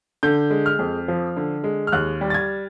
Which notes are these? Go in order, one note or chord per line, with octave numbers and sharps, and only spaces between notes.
D3 G6
G#3
F6
F2
F3
D3
G#3
F6
D#2 F#6
G3
A6
G#6